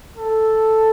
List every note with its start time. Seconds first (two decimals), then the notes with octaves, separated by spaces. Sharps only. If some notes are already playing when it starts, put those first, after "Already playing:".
0.17 A4